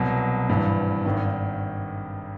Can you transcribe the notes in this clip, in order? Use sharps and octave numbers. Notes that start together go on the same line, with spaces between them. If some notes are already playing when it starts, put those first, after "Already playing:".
Already playing: C2 B2 F#3
G#1 G2 E3 G3
G#1 G2 D#3